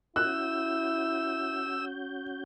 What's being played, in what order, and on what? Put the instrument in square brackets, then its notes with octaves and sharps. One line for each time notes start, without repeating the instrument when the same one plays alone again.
[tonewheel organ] C#4 F#4 G6 [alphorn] E4 [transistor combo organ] E6 [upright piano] F#6